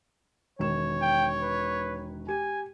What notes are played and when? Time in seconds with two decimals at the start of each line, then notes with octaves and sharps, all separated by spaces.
0.59 E1 D#3 C#5 E7
1.01 G5
1.42 B4
2.28 G4 G#5